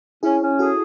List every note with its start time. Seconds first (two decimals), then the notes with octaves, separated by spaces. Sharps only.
0.23 C#4 E4 G#4
0.41 C#4
0.59 F#4 G#4 A4